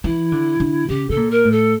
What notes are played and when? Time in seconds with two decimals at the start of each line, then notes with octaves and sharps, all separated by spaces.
0.04 E3 E4
0.32 D3
0.60 D3
0.88 C#3 G4
1.09 C#3 A4
1.16 A#2
1.30 A#4
1.45 A2
1.51 A4